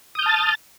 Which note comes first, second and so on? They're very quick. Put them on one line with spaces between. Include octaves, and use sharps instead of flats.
D#6 G6 F6 A5 A6